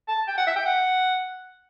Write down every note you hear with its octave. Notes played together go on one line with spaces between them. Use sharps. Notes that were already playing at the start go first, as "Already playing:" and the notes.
A5
G5
F#5
E5
G5
F#5